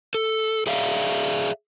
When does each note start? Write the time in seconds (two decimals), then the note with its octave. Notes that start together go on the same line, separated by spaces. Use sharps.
0.14 A4
0.67 G#4 D5 E5 F5